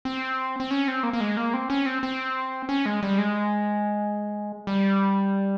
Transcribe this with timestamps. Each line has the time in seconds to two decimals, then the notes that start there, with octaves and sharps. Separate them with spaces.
0.05 C4
0.60 C4
0.71 C#4
0.88 C4
1.03 A#3
1.13 A#3
1.21 G#3
1.37 A#3
1.54 C4
1.70 C#4
1.86 C4
2.03 C4
2.69 C#4
2.86 G#3
3.03 G3
3.18 G#3
4.67 G3